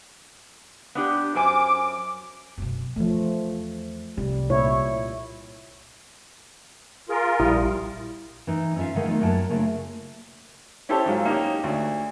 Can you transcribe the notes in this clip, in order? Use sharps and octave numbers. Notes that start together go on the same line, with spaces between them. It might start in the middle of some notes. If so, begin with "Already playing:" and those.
B3 D4 G4
F#2 C5 G#5 D6
F#2 B2
E2 F3 A3
C2 G3
A#2 E4 C#5
F4 G#4 A#4
A#1 G3 E4 D#6
E3 D#4
C#4 E4 F4 E5 F5
D3 D#3 G#3
A3 B3 D#4 F4
F#2 F#3 A#3 G5 A5
C#3 A3 A#3 D4 F4
C#4 E4 G4 A4 C5 C#5
G#2 F#3 F4
A#3 C#4 D#4 F4 G4
D2